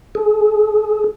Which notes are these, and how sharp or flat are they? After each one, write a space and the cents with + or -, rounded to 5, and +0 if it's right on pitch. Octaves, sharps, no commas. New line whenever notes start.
G#4 +40